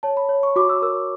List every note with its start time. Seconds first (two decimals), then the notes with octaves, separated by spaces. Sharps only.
0.03 C#5 A5
0.17 B5
0.29 C#5
0.43 C#6
0.56 F#4 D6
0.69 E6
0.82 A#4 E6